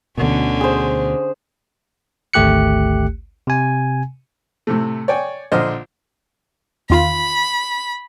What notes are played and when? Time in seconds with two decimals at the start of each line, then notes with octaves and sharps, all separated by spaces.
0.18 D2 B2 D3 C#4
0.61 G#4 C5
2.34 G#1 D2 A3 G4 F#6 C#7
3.47 C3 G#5
4.67 A2 C3 A3
5.08 C#5 D5 G5 G#5
5.52 A#1 D3 C5 D#5 F6
6.90 E2 D#3 F4 B5